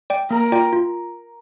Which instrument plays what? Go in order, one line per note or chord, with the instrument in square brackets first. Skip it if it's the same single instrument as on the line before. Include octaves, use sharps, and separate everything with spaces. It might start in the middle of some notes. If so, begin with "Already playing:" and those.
[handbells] D5 G5
[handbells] A#3 [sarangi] A#4
[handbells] F4 D5 G5
F4